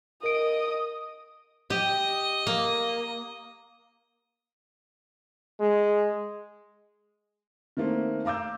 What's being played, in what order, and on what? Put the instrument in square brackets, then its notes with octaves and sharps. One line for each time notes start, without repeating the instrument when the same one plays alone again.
[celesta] A#4 D7 [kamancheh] D#5 D#6
[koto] G4 [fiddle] D#5
[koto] A#3
[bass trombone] G#3
[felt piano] D#3 A3 A#3 C4
F5 A#5 D6 E6 G6